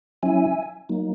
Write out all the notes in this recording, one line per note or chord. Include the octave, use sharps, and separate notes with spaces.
F#3 C#4 E4 E5 G#5
F#3 A#3 D#4